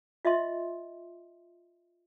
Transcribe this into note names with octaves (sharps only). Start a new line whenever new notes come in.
F4 D#5 E5 C6